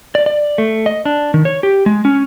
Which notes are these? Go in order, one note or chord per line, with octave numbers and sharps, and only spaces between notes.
D5
D5
A3
D#5
D4
D#3
C#5
G4
G#3
C#4